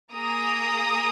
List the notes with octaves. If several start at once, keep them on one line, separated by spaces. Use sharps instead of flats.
A#3 G#4 A#5 D#6